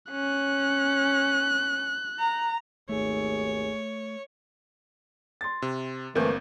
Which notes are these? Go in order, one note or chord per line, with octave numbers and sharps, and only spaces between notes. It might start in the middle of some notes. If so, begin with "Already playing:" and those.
C#4 F#6
A#5
G#1 D#2 A3 G#4 C#5
C6 A6
C3
G1 E3 A3 A#3 C4 G6